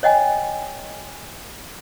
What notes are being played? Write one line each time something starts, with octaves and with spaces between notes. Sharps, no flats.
C#5 D#5 G5 G#5